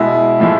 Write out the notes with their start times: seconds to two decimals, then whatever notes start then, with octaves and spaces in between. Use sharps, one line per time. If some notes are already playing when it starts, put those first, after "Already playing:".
Already playing: B2 G#3 E4
0.40 A2 F3 G#3